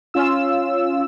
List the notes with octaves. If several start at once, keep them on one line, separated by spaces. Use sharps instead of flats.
C#4 F4 E6